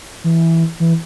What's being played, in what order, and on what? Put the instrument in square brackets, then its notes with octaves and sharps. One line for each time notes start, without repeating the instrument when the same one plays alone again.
[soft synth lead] E3
E3